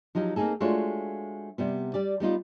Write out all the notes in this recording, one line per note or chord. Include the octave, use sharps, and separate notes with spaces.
F3 F#3 D#4 G4
A#3 C4 D4 D#4 G#4 A4
G#3 A3 D4 F4 F#4 C#5
C3 G3 B3
G3 G4 D5
G3 B3 D#4 F4